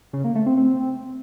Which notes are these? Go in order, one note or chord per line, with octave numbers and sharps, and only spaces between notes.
C#3
A#3
A3
C4
C4